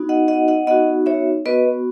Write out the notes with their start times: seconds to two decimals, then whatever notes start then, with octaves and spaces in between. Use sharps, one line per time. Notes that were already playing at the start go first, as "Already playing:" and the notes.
Already playing: B3 D#4 F#4
0.09 D#5 F#5
0.28 D#5 F#5
0.48 D#5 F#5
0.67 B3 D#4 F#4 D#5 F#5
1.06 C#5 E5
1.45 B3 F#4 B4 D#5